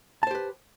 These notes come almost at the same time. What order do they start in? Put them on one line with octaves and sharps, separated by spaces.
A5 C5 G4 B4